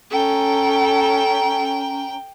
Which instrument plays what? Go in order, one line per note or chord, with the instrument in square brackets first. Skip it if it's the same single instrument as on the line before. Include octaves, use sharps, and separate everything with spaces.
[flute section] C#4 A#5 [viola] A4 [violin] G5